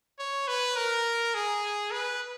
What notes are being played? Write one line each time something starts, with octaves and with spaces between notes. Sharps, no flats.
C#5
B4
A#4
G#4
B4